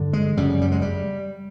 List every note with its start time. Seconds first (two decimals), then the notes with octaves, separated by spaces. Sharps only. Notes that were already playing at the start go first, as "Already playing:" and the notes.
Already playing: G2 D3
0.13 G#3
0.37 F#2 C#3 G3
0.61 G3
0.72 G#3
0.82 G3